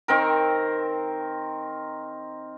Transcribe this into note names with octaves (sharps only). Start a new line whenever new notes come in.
D#3 C4 A#4